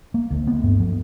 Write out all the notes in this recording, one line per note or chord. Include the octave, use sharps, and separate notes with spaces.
A#3
D2
B3
G2
F3